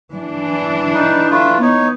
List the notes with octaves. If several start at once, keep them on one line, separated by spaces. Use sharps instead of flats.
E3 D4
D#4 B4
A3 F4 B4
B3 D#4 C#5